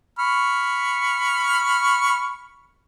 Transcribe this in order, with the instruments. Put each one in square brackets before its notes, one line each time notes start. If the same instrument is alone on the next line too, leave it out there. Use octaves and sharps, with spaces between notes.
[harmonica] B5 C#6 F6